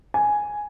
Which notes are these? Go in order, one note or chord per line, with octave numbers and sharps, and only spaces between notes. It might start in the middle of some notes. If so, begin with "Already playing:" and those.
G#5